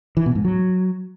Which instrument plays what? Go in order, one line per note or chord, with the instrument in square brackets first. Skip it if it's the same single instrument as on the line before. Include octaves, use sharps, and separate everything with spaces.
[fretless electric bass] E3
B2
G#2
F#3